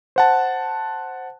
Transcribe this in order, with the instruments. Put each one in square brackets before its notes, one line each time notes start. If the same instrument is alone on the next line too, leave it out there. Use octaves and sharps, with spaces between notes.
[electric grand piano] C5 F#5 A5